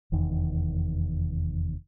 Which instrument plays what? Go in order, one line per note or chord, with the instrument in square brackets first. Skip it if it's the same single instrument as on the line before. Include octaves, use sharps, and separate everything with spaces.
[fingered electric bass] F1 E2 D#3